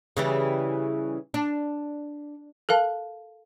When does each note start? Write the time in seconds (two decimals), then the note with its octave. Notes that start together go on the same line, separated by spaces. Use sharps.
0.17 C#3 E3 G3
1.34 D4
2.69 A4 A#4 F5 A5